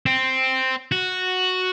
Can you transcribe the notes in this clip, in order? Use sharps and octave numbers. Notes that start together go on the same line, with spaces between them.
C4
F#4